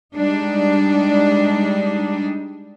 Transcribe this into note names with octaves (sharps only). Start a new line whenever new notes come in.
G3 G#3 D4 D#4